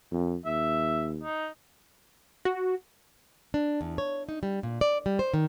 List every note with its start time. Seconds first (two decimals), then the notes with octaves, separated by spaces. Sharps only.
0.11 F2
0.46 D#2 E5
1.23 D#4
2.45 F#4
3.54 D4
3.81 E2
3.98 C#5
4.29 D#4
4.43 G3
4.63 A#2
4.81 D5
5.06 G3
5.19 C5
5.34 D#3